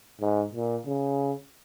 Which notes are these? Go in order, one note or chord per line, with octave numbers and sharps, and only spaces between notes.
G#2
A#2
C#3